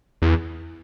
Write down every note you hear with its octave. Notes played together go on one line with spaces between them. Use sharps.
E2